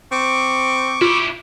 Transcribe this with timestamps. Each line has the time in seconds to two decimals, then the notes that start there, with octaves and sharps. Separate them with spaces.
0.12 C4 C#6 D6
1.01 E4 F4 G4